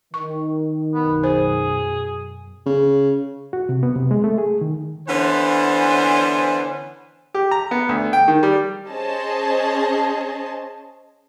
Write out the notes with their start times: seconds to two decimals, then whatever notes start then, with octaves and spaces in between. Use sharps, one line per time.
0.14 D#3 C#6
0.94 B1 F#2 B2 B3
1.24 G#4 C5
2.66 C#3
3.53 F#4
3.69 C3
3.83 B3
3.96 C3
4.11 G#3
4.24 A3
4.38 G#4
4.61 D#3
5.09 D3 E3 B3 C#4 D4 C5
7.34 G4
7.51 A#5
7.71 B3
7.89 D2
8.13 G5
8.28 D#3
8.43 G3
8.89 C#4 G#4 C5 D#5 A5